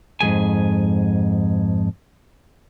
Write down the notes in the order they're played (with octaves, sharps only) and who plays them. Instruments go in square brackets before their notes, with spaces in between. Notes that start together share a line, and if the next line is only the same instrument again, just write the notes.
[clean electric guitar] F2 G#2 F3 G#4 G#5